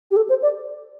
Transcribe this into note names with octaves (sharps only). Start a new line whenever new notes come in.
G4
A4
C5
D5